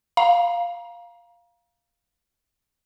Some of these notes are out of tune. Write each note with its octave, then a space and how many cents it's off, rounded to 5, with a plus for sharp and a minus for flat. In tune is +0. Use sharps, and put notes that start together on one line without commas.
F5 +0 A#5 +30